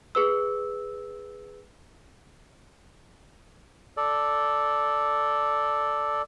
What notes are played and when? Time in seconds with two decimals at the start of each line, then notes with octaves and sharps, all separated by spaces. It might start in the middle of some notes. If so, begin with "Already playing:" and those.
0.15 G#4 B4 E6
3.97 A4 D5